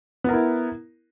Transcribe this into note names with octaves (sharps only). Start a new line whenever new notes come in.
B3 E4 A#4